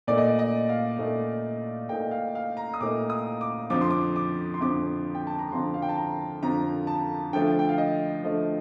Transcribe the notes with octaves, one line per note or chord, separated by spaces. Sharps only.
A#2 A3 D#4 D5
D#5
D5
D#5
F5
A#2 A3 D#4
A#2 A3 D#4 G5
F5
F5
A#5
D#6
A#2 A3 D#4 D6
D#6
D6
F2 D3 F3 D6
C6
D6
D6
C6
F2 D3 F3 D6
G5
A5
A#5
F2 D3 F3 C6
F5
G5
A5
A#5
F2 D3 F3 A#5
A5
D3 F3 A3 G5
G5
F5
D#5
D3 F3 A3 D#5